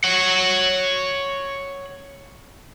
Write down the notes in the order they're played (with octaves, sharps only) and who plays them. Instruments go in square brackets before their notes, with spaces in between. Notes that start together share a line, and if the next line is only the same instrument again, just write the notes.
[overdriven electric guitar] C#5 F#5